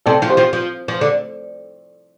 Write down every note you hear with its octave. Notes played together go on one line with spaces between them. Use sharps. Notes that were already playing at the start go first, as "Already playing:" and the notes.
C3 C4 A4 D5
F3 F4
G4 C5
F3 F4
F3
F3
D3